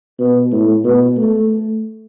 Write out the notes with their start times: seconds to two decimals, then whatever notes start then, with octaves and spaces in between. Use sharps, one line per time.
0.19 B2
0.52 A2
0.84 B2
1.17 A3